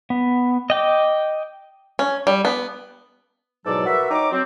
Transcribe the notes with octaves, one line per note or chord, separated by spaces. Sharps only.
B3
D#5 G5 D6
C#4
G3
B3
E2 G#2 B2 F#3 A4 D5
F#4 A#4 B4 E5
D#4 C#5 G5 A#5 D6
F#3 C4